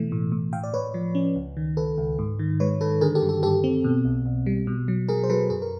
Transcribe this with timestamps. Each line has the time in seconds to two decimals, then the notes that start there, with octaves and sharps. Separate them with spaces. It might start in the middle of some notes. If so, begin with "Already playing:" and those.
Already playing: B2 E3 A3
0.12 A2
0.32 A2
0.53 A2 F5 G5
0.64 D5
0.73 A2 B4 C#5
0.94 F3
1.15 C#4
1.36 C#2
1.57 D#3
1.77 C#2 A4 B4
1.98 C#2
2.19 G#2
2.39 D#3
2.60 G#3 B4 C#5
2.81 D#3 A4 B4
3.01 D3 G#4 A#4
3.15 G4 A4
3.22 G2
3.29 G4 A4
3.43 G2 G4 A4
3.64 C4
3.84 B2
4.05 B1
4.26 B1
4.46 G3
4.67 B2
4.88 F#3
5.08 F#3 G#4 A#4
5.24 C5
5.30 F#3 A4 B4
5.50 F#2 G#4 A#4
5.62 A#4